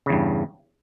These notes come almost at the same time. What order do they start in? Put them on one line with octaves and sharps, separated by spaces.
C#3 E2 G2